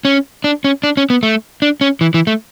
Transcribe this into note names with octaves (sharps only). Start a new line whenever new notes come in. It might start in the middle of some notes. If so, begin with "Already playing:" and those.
C#4
D4
C#4
D4
C#4
B3
A3
D4
C#4
E3
E3
A3